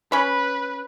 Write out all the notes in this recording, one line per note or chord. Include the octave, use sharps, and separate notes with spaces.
C#4 B4 B5